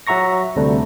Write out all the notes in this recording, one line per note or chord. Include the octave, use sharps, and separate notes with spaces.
F#3 F#4 E5 A#5 C#6 A#6
D2 C3 G3 A3 D4